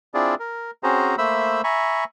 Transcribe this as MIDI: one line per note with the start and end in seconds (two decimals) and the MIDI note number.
0.14 0.35 60
0.14 0.35 62
0.14 0.35 64
0.14 0.35 65
0.14 0.35 68
0.14 0.35 74
0.39 0.71 70
0.83 1.15 60
0.83 1.15 61
0.83 1.15 66
0.83 1.15 68
0.83 1.15 72
0.83 1.15 82
1.18 1.61 57
1.18 1.61 58
1.18 1.61 72
1.18 1.61 76
1.18 1.61 83
1.18 1.61 88
1.64 2.04 76
1.64 2.04 80
1.64 2.04 82
1.64 2.04 83
1.64 2.04 85